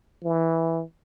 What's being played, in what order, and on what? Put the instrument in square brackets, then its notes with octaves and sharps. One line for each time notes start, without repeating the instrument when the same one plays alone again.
[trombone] E3